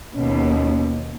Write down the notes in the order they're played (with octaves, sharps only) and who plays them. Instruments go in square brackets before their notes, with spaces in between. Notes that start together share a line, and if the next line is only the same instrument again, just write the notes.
[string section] D#2 B2 [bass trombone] C#4